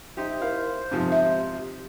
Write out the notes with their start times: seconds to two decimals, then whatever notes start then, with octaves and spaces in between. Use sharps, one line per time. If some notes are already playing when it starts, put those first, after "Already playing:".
0.17 D#4 G4 C5 E5
0.41 E4 A#4 F5
0.91 G#2 C3 F3 G4
1.12 E5